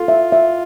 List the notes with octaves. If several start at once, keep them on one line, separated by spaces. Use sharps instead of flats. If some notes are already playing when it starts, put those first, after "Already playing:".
Already playing: F4 A4
E5
E5